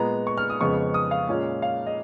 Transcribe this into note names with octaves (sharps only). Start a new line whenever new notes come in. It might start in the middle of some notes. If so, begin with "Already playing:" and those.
Already playing: A#2 G#3 B3 A#5
C#6
F6
D#6
F2 C#3 G#3 B3 C#6
D#6
F5
A#2 G#3 C#4
F5
D#5